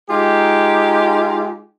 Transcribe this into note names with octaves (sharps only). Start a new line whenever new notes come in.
G#3 D#4 F4 G4